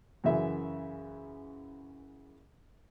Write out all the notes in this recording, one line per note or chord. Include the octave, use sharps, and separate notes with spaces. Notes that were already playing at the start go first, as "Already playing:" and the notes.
F#2 C#3 E3 E5